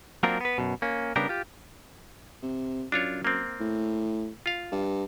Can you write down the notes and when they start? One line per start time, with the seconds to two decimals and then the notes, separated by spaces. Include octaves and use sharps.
0.23 F#3 A#3 C4 D4 F4 A#4
0.41 B3 B4
0.58 F#2 B2
0.82 A#3 C#4
1.16 C#3 G3 B3 D4 G4 A#4
1.29 F4 G4
2.43 C3
2.92 F#2 D4 F4 C#5
3.25 A#3 C4
3.60 A2
4.46 F4 F5
4.72 G2